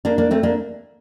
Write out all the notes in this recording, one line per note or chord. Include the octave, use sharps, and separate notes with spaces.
A#3 D4
A#3 D4
A3 C4
A#3 D4